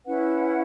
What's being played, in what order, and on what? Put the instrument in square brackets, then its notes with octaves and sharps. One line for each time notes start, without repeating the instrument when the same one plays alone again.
[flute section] C#4 E4 B4 F#5